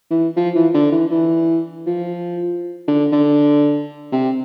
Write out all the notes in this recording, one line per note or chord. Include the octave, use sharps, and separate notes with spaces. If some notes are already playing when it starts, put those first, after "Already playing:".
E3
F3
E3
D3
E3
E3
F3
D3
D3
C3